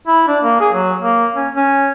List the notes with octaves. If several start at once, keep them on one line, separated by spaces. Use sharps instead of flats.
E4
D4
A#3
G#4
F#3
A#3
C#4
C#4